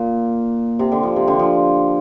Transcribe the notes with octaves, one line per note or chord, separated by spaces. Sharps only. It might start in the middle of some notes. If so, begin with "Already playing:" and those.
Already playing: A#2
C3
D3
F3
C3
D3
F3